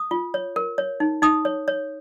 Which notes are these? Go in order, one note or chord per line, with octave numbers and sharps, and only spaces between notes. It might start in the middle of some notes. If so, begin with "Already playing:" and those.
Already playing: D#6
F4
C#5
A#4
C#5
D#4
D#4 D#6
C#5
C#5